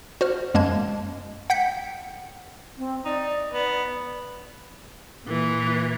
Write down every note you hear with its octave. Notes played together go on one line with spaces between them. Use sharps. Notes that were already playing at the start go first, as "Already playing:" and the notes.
F#4 C5 F6
F#2 G#3 A#3 A5 G#6
F#5 G5 G6 B6 C#7
C4
D#4 D5
B3
A#2 E3